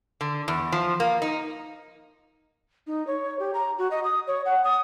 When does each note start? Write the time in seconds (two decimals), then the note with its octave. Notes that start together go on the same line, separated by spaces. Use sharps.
0.21 D3
0.48 E2
0.72 F3
1.00 A#3
1.22 D#4
2.87 D#4
3.07 C#5
3.40 G4
3.54 A#5
3.78 F#4
3.91 D#5
4.04 D#6
4.27 C#5
4.45 F#5
4.64 D#6